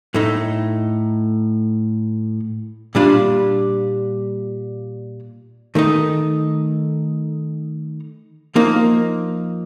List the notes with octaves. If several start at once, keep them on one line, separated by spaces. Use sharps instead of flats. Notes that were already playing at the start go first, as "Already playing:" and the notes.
A2 A3 D#4
A#2 G3 D4 F4
D#3 A3 D#4
F3 A#3 D#4